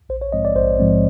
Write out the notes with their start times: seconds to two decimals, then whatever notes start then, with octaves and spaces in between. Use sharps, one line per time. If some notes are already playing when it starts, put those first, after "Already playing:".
0.09 A#1 C5
0.21 C#5
0.33 G#2 F3 G#3 C4 D#5
0.45 D5
0.56 A#1 C5
0.79 G#2 F3 G#3 C4